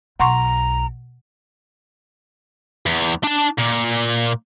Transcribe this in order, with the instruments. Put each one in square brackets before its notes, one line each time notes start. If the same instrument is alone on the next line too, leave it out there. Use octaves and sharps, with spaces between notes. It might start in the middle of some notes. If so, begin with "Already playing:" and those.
[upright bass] B1 [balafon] F#5 C6 C#6 [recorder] A#5
[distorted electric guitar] E2
D4 A5
A#2